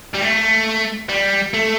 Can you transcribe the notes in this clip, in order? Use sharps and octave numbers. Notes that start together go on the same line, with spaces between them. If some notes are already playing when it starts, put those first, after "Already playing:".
G3
A3
G3
A3